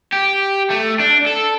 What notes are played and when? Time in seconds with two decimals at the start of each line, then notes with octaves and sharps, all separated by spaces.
0.12 G4
0.70 A3
1.00 D4
1.27 A4